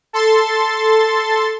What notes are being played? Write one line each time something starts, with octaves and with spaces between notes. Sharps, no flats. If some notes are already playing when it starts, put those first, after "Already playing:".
A4 C6 A6